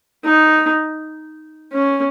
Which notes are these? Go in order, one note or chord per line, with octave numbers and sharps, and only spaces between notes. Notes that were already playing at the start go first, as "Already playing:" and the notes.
D#4
C#4